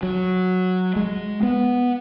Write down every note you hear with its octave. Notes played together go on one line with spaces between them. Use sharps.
F#3
G#3
B3